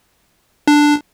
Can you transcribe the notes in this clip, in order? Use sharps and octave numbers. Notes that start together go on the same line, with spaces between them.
D4